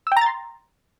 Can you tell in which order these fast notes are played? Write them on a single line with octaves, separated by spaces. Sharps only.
E6 G5 A#5 A6 C6